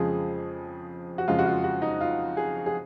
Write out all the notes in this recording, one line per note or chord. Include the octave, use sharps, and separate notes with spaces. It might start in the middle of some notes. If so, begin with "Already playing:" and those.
Already playing: F2 C#3 F3 G#3 G#4
F#4
F2 C#3 G#3 F4
F#4
F4
F#4
D#4
F4
G#4
G#4